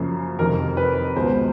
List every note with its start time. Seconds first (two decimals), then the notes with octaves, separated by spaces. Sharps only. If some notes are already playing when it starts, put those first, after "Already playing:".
Already playing: F#2 C#3 F3 A#3
0.39 F2 C3 D#3 A#4
0.77 B4
1.16 C#2 B2 G#3 C5